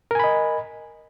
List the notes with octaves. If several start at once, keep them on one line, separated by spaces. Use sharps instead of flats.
A#4 D#5 G#5 B5